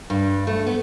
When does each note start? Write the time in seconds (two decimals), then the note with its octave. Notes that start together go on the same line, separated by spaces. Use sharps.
0.10 G2
0.47 A3
0.66 B3